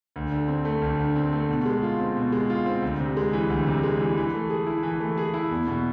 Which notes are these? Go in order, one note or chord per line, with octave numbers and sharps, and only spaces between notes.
D2
D3
C4
A3
D2
D3
C4
A3
B2
G#3
F4
C4
B2
G#3
F4
C4
D2
C3
G#3
E3
D2
C3
G#3
E3
E3
A3
G#4
E4
E3
A3
G#4
E4
E2
B2